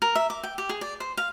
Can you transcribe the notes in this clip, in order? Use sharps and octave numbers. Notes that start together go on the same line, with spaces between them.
A#4
E5
D6
G5
G4
G#4
D5
C5
F5